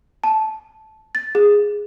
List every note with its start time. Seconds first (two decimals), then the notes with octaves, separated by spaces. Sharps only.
0.24 A5
1.15 A6
1.35 G#4